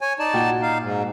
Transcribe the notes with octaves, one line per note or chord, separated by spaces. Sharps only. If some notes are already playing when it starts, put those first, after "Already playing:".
C#5 G#5
D#4 D5 A5
A#2 F#4 G5
D#4 F5
G#2